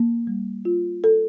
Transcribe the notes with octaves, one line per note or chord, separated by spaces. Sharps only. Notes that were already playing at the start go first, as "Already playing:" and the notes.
Already playing: A#3
G3
F4
A4